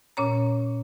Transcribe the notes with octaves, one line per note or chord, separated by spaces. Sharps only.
A#2 C#4 C#5 A#5